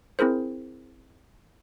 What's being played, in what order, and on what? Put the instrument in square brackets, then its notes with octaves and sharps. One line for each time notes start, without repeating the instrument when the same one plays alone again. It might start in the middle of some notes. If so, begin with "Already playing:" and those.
[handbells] C4 E4 G#4 A#4 C5